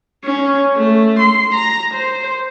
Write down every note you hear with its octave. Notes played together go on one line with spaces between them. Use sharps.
C#4
A3
C6
A#5
C5